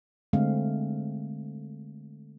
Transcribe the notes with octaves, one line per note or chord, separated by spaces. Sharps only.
D3 G#3 A3 C4 F5